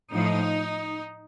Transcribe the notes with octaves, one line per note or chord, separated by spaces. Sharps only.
A2 F3 D#4